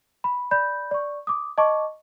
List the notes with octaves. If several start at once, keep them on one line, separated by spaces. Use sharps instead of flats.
B5
D5 B5 G6
D5 C#6
D6 D#6
D#5 A5 C#6 D6